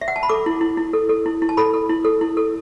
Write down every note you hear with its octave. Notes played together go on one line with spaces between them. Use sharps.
E5
F#5
A5
B5
A4 D6
E4
E4
E4
A4
A4
E4
E4
A5
A4 B5
A4
E4
A4
E4
A4